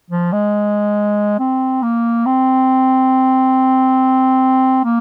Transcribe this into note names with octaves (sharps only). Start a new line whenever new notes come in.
F3
G#3
C4
A#3
C4
A#3